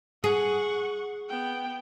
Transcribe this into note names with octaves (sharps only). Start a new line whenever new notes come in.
G#4 F#5 C#6
B3 G5